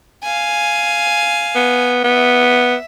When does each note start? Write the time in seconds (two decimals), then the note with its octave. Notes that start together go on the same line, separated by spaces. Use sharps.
0.23 F5 G#5
1.55 B3
2.04 B3 E5